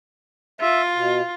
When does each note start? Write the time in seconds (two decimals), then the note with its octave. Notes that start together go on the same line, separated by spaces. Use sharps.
0.61 F4 E5
0.94 B2